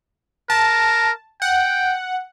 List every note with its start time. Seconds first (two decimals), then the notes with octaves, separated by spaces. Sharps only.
0.50 A#4 A5
1.42 F#5 G5